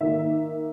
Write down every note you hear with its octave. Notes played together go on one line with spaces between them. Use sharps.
D#3 A#3 D#4 E5